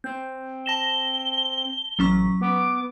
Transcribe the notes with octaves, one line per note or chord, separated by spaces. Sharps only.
C4 G6
A5 A#6 E7 G7
A1 F#3 C#4 C#6
B3 D6